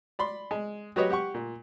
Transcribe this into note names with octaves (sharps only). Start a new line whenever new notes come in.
D5 B5 C6
G#3
F#3 F#4 G4 B4 C#5 D#5
G4 F#5 C#6
A#2